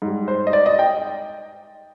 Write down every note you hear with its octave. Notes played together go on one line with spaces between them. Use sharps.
G#2 G3
C5
D#5
D5
D#5
G5